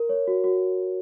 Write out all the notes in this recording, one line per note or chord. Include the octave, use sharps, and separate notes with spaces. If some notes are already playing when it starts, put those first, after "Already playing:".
Already playing: A#4
C#5
F#4
F#4